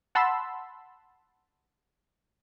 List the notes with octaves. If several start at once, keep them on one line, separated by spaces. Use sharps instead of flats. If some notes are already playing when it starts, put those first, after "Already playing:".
F#5 A5 B5 C6 E6